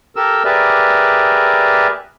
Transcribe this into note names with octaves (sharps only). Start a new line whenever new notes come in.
G4 A4 A#4 E6
G4 G#4 A#4 B4 D5 E5